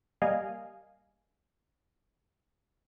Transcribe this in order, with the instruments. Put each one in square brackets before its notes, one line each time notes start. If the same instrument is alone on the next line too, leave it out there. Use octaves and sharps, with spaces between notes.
[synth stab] G3 A#3 D#5 F5 G#5